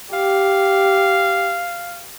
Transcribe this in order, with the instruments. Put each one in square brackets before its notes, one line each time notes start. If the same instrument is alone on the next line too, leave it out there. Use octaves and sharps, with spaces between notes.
[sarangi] G4 [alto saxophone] F5